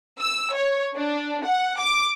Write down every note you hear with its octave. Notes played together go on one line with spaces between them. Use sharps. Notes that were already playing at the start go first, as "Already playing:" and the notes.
E6
C#5
D4
F#5
D6